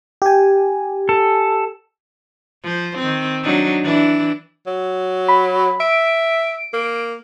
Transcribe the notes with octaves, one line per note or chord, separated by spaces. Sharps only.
G4 G#5
A4
F3 C5
D#3 C4
F#3 D4 D#4
E3 D4 E4
F#3
B5
E5 D7
A#3